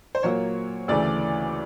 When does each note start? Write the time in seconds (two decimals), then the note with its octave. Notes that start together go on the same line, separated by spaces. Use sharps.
0.15 C5
0.23 A#2 F#3 A#3 C#5
0.88 D2 C#3 E3 A3 D5